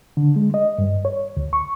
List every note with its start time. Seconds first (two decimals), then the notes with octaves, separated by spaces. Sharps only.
0.17 D3
0.36 G#3
0.54 D#5
0.78 G2
1.05 C#5
1.37 D2
1.53 C#6